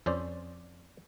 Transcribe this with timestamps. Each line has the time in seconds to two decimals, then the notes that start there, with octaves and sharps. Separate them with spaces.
0.06 F2 C#4 C5 D5